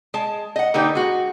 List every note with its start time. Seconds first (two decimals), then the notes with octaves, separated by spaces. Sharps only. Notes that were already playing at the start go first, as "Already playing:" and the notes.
0.14 G#3 A5
0.56 D#5 F#5
0.74 D3 A#3 D#4 G4 B4
0.95 G#3 F#4